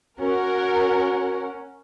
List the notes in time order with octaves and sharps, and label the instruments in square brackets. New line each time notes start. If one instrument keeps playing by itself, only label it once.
[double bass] C#4 [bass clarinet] F#4 [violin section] A#4 F#5